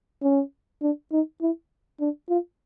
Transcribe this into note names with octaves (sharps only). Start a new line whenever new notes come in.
C#4
D4
D#4
E4
D4
F4